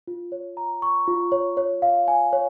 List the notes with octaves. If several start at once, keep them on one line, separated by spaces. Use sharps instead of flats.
F4
C#5
A#5
C#6
F4
C#5
C#5
F5
G#5
C#5